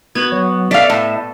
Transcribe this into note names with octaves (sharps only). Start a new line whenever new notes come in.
B3 F#4 G#6
F#3
A4 D5 E5 F5
A2